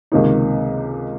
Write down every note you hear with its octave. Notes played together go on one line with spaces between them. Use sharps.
C#2 C3 D#3 A#3 D#4